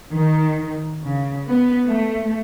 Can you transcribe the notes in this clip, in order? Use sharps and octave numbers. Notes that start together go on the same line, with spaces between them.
D#3
C#3
B3
A3